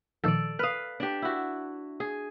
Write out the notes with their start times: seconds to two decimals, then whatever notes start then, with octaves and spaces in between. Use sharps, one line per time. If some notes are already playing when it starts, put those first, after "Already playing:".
0.24 A#2 D#3 F3 A4 D5
0.59 B4 F5 D#6 F6
1.00 D4 G4
1.22 E4 F#4
2.00 G#4